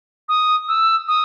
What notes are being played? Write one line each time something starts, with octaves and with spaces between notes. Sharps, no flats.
D#6
E6
D#6